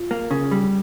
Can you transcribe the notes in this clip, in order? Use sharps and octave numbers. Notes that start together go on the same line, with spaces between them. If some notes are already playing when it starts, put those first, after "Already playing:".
Already playing: F4
A#3
C#3
G3